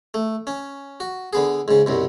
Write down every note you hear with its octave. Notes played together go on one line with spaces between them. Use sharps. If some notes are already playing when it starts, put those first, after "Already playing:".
A3
C#4
F#4
D3 B3 G#4
G#2 C#3
C2 F#2 B2